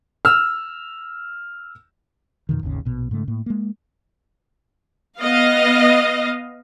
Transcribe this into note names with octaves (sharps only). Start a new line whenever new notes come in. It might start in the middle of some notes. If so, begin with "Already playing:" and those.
E6 F6
F2 B2 D3 D#3
G#1 D#2 C#3
A#1 B2
G#2 C#3 A3
A2 A#3
G#3 A#3
B3 D#5 F5